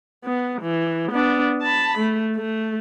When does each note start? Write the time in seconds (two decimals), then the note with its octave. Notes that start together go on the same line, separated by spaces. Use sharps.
0.24 B3
0.61 E3
1.12 B3 D4
1.62 A5 B5
1.98 A3
2.36 A3